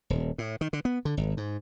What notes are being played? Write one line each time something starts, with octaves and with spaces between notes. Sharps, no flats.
D#1
A2
D#3
D3
B3
D3
G#1
G#2